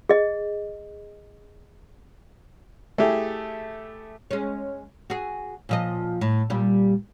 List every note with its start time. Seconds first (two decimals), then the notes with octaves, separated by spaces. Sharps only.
0.09 G#4 D#5
2.98 A3 E4 G4 G#4
4.31 G#3 C#4
5.10 F#4 G#4
5.69 A#2 F3 D#5
6.21 A2
6.50 A#2 G3